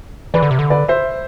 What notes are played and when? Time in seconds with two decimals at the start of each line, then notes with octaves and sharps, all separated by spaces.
0.34 E3 B4 D5
0.42 D3
0.51 C3
0.59 D3
0.70 B4 D5
0.88 C5 E5